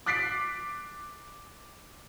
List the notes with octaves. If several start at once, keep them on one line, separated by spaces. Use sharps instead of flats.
D6 F#6 A6 B6 C7 D7